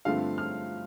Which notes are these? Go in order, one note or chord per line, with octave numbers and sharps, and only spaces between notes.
G2 D3 F3 A3 C4 F5
F6